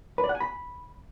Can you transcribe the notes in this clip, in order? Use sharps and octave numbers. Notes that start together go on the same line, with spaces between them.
B4
D5
F#5
G#5
B5